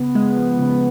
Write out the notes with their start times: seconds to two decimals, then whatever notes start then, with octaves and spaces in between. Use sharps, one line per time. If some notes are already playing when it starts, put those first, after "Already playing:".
Already playing: C#3 B3
0.15 G#3
0.37 F3
0.59 C#3